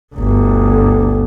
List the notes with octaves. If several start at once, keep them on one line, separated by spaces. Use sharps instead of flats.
G1 D2